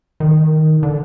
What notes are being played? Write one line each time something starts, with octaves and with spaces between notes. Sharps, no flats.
D#3
D3